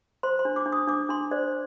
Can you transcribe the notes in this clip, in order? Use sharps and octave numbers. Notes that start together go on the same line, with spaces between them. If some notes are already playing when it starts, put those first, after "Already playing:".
C5 C6
C6
D4
D6
D4
D#6
D4 D6
D4 C6
C5 D5